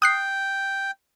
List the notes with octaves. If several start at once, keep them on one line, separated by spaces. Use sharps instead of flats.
G5 D#6 F#6 C7